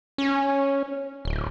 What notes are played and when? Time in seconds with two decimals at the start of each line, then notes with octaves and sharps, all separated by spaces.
0.18 C#4
1.25 D1